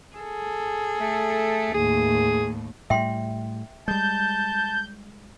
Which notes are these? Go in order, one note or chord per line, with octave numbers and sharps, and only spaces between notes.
G#4 A4
A3
D#2 A2 G#4
A2 G3 E5 G5 C6
G3 G#3 A5 G6